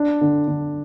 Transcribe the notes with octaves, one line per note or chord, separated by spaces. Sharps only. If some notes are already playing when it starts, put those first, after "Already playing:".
Already playing: D4
D3
D3